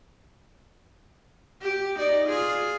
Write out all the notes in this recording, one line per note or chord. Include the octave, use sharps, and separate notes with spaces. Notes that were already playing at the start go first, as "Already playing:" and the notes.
G4
D#4 D5
F4 G#4